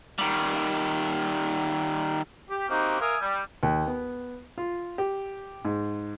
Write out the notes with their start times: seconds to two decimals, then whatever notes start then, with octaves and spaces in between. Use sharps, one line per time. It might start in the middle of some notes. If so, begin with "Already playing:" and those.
0.19 D#3 G3
2.49 G4
2.69 A#3 C4 D#4 F#4 G4
3.00 A#4 E5 F5 G#5 D#6
3.21 G3
3.63 D#2
3.87 B3
4.58 F4
4.98 G4
5.65 G#2